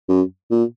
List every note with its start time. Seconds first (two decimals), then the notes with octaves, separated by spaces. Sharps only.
0.09 F#2
0.51 A#2